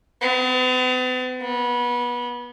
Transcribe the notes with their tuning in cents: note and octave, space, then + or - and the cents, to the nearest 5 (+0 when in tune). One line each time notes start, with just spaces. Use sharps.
B3 +45
B3 -25